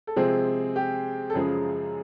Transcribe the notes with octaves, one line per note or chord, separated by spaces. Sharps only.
A4
C3 F3 G#3 C4 G#4
G4
A4
F#2 C#3 F3 G#3 G#4